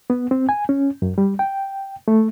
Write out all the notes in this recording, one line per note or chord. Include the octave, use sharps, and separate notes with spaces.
B3
C4
G#5
C#4
F#2
G3
G5
A3